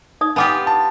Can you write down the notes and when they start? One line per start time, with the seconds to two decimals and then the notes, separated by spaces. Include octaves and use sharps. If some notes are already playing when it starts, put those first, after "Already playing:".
0.21 D#4 D5 D#6
0.36 B3 D4 F4 G4 G#5 D6
0.67 A5